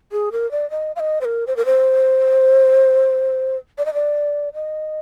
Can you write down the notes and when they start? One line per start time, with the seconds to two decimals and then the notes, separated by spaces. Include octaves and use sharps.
0.12 G#4
0.32 A#4
0.51 D5
0.71 D#5
0.96 F5
1.00 D#5
1.21 C5
1.25 A#4
1.47 C5
1.56 A#4
1.65 C5
3.78 D5
3.85 D#5
3.94 D5
4.54 D#5